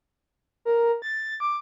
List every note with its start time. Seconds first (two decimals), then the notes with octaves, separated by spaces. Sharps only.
0.65 A#4
1.02 A6
1.40 D6